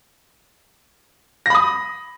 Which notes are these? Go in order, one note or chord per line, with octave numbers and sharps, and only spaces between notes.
B5 D#6 A#6